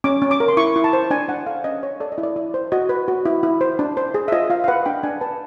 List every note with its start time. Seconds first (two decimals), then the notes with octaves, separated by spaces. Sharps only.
0.04 C#4 D6
0.22 C#4
0.31 D6
0.40 A#4
0.48 C6
0.57 E4 C#6
0.76 E4
0.84 A5
0.93 C5
1.11 D4 G#5
1.29 D4 F#5
1.46 A4 F5
1.64 C#4 D#5
1.83 C#5
2.00 A4 D5
2.12 D#5
2.18 E4
2.23 D5
2.36 E4
2.54 C5
2.72 F#4 D#5
2.89 B4
3.08 F#4
3.25 E4
3.43 E4
3.61 C5
3.79 D4
3.97 C5
4.14 G#4
4.28 E5
4.32 F4 D#5
4.50 F4 F5
4.64 F5
4.68 B4 F#5
4.86 D4 G5
5.03 D4 G#5
5.21 B4 A5